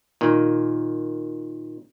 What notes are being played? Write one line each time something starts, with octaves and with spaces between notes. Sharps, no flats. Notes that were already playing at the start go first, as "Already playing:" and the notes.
A#2 D#3